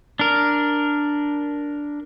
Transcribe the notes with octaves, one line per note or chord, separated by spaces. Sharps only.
D4 A#4